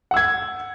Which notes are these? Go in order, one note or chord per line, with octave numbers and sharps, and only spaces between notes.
F#5 E6 G#6